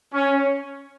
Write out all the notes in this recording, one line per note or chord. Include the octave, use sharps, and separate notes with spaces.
C#4